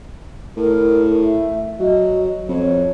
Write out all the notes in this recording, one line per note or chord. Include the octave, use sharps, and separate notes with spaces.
A2 A#4
E5
F#3 D#5
F2 C#5